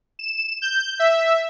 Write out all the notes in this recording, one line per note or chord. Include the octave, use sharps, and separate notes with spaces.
E7
G6
E5